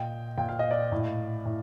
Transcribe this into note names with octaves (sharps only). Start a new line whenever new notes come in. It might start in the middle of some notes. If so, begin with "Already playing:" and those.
Already playing: A#2 D#5 G5
A#2 G5
F5
D#5
D5 F5
A2
A2